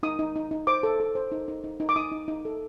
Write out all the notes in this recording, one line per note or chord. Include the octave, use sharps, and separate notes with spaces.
D#4 D#6
D#4
D#4
D#4
C5 D6
A4
A4
C5
D#4
D#4
D#4
D#4
D6
D#4 D#6
D#4
D#4
A4